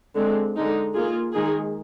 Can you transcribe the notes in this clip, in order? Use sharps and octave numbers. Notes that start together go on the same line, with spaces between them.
D3 G#3 C4
D3 G#3 D#4
A#3 F4 G#4
D#3 G#3 D#4 G#4